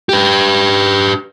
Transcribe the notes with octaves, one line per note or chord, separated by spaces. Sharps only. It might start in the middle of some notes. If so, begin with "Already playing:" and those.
G4 B4